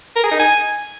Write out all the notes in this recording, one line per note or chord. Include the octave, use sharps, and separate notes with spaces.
A#4
G#4
D#4
G#5